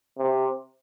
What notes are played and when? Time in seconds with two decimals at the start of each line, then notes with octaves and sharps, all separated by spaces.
0.18 C3